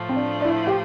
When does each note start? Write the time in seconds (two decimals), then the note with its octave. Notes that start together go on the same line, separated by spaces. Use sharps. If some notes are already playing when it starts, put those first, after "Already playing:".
Already playing: A2 F3 A3
0.09 C4
0.15 D4
0.41 D4
0.44 E4
0.67 G4